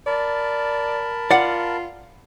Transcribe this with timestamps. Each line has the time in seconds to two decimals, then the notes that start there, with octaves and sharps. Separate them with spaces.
0.07 A#4 D5 A5 B5
1.31 F4 D5 F#5